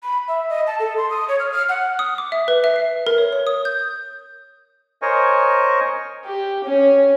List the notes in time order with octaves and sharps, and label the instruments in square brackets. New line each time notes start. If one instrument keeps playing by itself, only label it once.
[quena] B5
E5
D#5
A5
A4
C6
D#6
C#5
F6
F6
F#5
[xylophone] D#6
D6
E5
B4
E5
C7
A#4
C#5
C#5
D#6
G6
[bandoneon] A#4 C5 C#5 D#5 G#5 C#6
[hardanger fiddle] G4
C#4